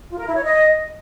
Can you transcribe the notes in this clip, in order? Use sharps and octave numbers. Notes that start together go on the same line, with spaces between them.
F4
A#4
E4
C#5
D#5